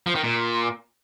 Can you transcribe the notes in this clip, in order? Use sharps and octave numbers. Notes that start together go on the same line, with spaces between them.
F3
D#3
A#2